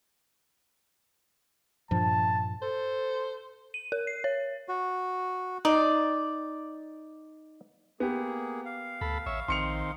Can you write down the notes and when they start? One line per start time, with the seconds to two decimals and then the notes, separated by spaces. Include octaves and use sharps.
1.91 G2 A#2 F3 A5
2.62 A4 C5
3.74 D#7
3.92 A#4
4.07 C7
4.24 C#5
4.69 F#4
5.65 D#4 D5
8.00 A#3 B3 G4 G#4
8.65 F5
9.01 D2 A4 B5
9.26 A1 C#5 E5
9.48 A#1 D#3 C4 C6 C#7 F7